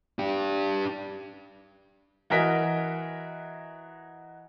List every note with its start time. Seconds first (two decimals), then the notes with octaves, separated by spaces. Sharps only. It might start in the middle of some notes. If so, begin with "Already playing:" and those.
0.19 D4 G4
2.30 E3 F#4 A#4 D#5 B6